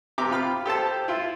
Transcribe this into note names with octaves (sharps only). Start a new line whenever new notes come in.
C3 G4 A#5 D6
F4 B5 F6
G4 A4 C5 A5
E4 F4